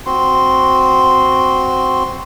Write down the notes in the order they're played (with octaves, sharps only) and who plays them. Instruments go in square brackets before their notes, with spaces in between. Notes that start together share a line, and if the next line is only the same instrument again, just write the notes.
[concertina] C4 F#4 C6